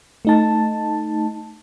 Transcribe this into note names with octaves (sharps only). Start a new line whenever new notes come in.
A3 D#4 A5